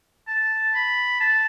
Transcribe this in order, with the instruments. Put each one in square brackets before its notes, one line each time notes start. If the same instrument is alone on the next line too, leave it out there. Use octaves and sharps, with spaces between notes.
[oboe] A5
B5
A5